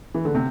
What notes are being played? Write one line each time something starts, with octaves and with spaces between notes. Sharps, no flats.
E3
D3
C3